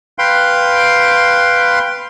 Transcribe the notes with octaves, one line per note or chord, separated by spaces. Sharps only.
B4 F5 G5 C6